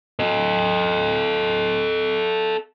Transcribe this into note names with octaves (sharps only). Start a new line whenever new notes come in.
A4 D#5